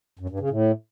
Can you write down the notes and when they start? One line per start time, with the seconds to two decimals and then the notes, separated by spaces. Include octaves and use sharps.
0.19 F#2
0.29 G2
0.40 C#3
0.50 A2